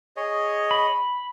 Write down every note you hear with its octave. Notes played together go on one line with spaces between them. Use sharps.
G#4 C#5 D#5
B5